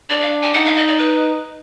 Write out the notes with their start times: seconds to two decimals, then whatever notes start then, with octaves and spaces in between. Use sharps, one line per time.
0.10 D4 D5
0.21 F5
0.42 G#5
0.54 D#4 F#5
0.65 F5
0.76 D#5
0.88 D5
0.98 B4